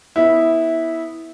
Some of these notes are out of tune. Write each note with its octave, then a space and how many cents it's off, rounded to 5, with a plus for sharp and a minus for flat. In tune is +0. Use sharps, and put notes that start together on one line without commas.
B3 +0 E4 -15